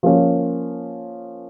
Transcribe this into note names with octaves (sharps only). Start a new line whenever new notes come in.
F3 A#3 C#4